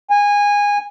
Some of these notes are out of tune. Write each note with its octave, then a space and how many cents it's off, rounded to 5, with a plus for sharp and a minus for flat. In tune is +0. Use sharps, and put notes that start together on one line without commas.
G#5 -20